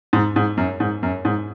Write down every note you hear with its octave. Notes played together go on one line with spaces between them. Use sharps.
G#2
G#2
F#2
G#2
F#2
G#2